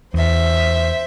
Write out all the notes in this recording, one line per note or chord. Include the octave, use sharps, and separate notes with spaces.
E2 C5 E5